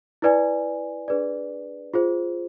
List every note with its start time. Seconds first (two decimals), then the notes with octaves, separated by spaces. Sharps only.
0.22 E4 B4 D5 G#5
1.08 D4 G#4 B4 D5
1.94 F4 G#4 C5